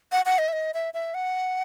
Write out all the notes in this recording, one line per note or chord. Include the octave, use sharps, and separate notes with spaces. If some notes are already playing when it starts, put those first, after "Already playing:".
F#5
F#5
D#5
E5
D#5
E5
E5
F#5